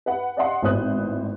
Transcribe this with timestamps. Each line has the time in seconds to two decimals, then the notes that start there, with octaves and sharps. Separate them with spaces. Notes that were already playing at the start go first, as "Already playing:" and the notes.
0.06 B4 F#5
0.37 D5 D#5 F5 F#5 C6
0.62 G#1 A2 B3 C5 D#6 F#6